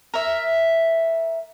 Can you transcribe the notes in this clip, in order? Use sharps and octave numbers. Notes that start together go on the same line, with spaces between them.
A#4 E5